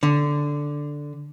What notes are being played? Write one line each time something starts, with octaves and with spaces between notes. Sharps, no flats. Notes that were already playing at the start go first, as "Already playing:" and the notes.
D3